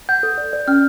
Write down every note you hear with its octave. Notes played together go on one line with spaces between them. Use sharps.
F#5 G6
A4
D5
D5
C#4 F6